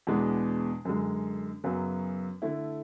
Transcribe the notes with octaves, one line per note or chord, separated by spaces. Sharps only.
E2 B2 G#3 B3 D4
F#2 D3 G#3
F#2 C#3 F#3 B3
D3 A3 E4